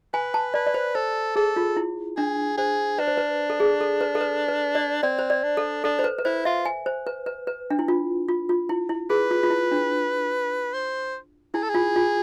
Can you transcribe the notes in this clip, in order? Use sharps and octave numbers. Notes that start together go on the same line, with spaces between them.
B4 G#5
A5
B4 D5
D5
C5
A4 C5
G#4 A4
F4
E4
D4 G#4
G#4 C5
D4 B4
C5
B4
A4
G#4
A4
B4
A4
B4
B4
D5
C4 D5
C5
D5
D4
A4
D4 A4
C5
B4
B4
E4 C5
F4 E5
G#5
C5
B4
B4
B4
D4
E4
F4
F4
F4
E4
E4
G#4 B4
F4
F4
E4
D4
C5
E4 G#4
A4
G#4
F4
F4